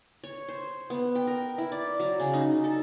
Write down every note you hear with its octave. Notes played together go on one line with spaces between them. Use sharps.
C#5
C5
B3
G5
A#4
E4
D5
F#3
C#3
D#4
A4